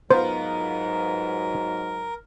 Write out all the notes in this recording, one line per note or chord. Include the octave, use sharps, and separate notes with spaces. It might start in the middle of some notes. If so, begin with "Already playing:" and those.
G#2 F#3 B3 F4 A#4 C5